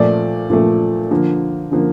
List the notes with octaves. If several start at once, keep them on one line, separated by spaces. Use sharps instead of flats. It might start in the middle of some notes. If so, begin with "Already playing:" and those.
Already playing: A#2 F3 A3 D5
A#2 F3 A3
D3 F3 A#3
D3 F3 A#3